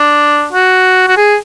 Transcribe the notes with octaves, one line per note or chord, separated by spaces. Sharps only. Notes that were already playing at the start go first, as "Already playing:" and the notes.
Already playing: D4
F#4
F#4
G#4